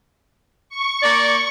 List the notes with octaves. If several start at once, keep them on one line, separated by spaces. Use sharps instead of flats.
C#6
A#3 D5